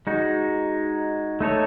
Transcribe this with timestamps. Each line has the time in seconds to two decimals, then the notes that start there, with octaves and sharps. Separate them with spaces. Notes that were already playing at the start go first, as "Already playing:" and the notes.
0.07 G#3 D#4 F#4
1.40 A3 D#4 A4 C#5